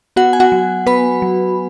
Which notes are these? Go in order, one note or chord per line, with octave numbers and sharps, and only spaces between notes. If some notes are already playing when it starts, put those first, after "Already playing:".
B3 F#4 F#5
G#5
F#4 F#5
F#3
B3 B4 B5
F#3